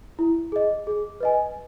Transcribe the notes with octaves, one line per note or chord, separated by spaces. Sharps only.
E4
G#4 D#5
G#4
B4 D#5 G#5